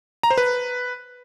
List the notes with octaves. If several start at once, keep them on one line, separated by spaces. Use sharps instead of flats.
A#5
C5
B4